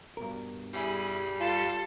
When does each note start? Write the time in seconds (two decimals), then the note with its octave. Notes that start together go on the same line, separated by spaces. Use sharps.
0.17 G2 B2 A#4
0.74 G3 E4 G#4
1.40 F4 A4